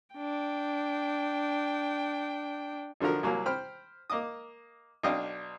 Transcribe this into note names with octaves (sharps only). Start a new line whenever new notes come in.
D4 G5
B1 D3 F3 F#4 A#4
C2 F#3 A#3
C5 G5 B5 F6
A#3 D#5 D6 D#6
B1 D4 D#5 F5 G5